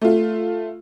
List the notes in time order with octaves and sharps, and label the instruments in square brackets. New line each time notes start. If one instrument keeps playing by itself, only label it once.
[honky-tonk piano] A3 F4